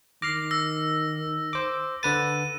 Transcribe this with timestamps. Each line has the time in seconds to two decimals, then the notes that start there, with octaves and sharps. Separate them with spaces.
0.22 D#3 D6 F6 A#6 C7
0.51 E6 A#6
1.53 C5 D6
2.03 D3 B4 A6 D#7